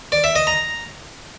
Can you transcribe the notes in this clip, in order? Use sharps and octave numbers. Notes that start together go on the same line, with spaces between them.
D5
E5
D#5
A#5